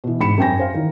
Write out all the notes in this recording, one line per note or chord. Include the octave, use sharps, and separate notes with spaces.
B2 E3
G#2 B5 C#7 E7
F#2 C4 G5 G#5 A#6
C5 F5
D#3 E3